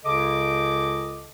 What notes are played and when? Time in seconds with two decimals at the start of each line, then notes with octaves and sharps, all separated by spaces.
0.05 C#2 C#3 A4 D#5 D6